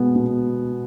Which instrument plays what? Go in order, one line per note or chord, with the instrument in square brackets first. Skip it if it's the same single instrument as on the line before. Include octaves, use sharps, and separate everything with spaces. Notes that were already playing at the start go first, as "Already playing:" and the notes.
Already playing: [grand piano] B2 G#3 B3
B2